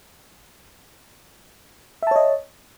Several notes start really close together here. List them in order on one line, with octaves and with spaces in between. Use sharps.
E5 A5 C#5 D#5